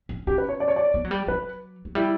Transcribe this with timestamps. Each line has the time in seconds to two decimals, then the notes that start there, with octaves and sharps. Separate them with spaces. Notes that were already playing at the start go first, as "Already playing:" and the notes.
0.09 C#4
0.27 C#4 G4
0.38 B4
0.49 C#5
0.60 D5
0.68 C#5
0.76 D5
0.94 B3
1.05 F#3
1.11 G3
1.27 F#3 B4
1.85 F#3
1.95 G3 E4